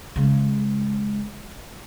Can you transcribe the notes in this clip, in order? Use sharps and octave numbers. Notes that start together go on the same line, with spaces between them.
C#3 G#3